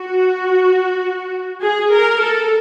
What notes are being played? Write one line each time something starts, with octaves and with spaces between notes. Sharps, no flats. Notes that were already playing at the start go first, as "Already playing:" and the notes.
Already playing: F#4
G#4
A#4
A4